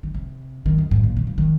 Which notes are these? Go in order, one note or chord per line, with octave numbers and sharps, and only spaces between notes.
D#3
C3
D#3
F2
G#2
A#2
D#3
F3
D#3